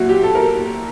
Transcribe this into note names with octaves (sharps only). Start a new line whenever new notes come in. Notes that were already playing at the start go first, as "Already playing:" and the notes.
Already playing: A#2 F#3 E4 F#4
G4
A4
A#4